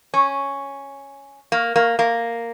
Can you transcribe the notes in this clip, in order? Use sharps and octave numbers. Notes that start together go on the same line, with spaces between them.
C#4
A#3
A#3
A#3